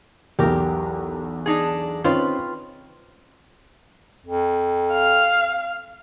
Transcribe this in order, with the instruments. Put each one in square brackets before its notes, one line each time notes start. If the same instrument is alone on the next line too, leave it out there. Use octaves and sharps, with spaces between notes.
[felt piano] B1 E2 [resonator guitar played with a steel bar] G4 A#4
[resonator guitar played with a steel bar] D4 D#4 G#4
[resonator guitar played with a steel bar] D#3 F4 B4 [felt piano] C4 C#4 D#4
[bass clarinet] F2
[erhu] F5